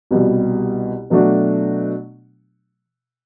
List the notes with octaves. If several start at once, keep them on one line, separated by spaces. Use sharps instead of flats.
C2 B2 G3
B2 F#3 A3 D4 F#4